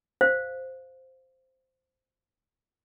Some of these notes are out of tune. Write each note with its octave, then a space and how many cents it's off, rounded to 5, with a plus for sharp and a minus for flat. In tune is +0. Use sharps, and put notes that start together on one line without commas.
C5 +0 F5 +0